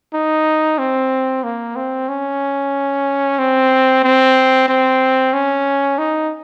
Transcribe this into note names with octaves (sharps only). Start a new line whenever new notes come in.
D#4
C4
A#3
C4
C#4
C4
C4
C4
C#4
D#4